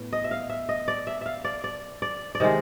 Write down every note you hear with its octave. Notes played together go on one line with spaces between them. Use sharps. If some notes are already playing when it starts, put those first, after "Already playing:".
Already playing: A2 B3
D#5
E5
F5
E5
D#5
D5
E5
E5 F5
D5
D5
D5
D5
C3 D#3 G#3 D#5